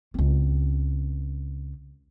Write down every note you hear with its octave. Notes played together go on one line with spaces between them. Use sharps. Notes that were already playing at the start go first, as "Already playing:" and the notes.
C#2 C4